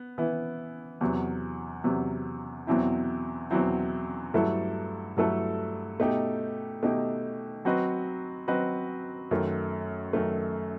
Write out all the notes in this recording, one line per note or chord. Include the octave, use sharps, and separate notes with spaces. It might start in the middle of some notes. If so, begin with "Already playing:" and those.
Already playing: B3
E3 B3 E4
E2 C3 F#3
E2 C3 F#3
E2 B2 F#3 C4 E4
E2 B2 F#3 C4 E4
G2 F#3 A3 E4 A4
G2 F#3 A3 E4 A4
B2 A3 D#4 G4
B2 A3 D#4 G4
F#3 C4 F#4 B4 D#5
F#3 C4 F#4 B4 D#5
F#2 D#3 A3
F#2 D#3 A3